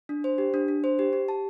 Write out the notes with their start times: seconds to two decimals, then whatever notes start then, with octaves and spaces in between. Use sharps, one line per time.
0.09 D4
0.24 C5
0.38 G4
0.54 D4
0.68 D4
0.84 C5
0.99 G4
1.13 G4
1.28 A5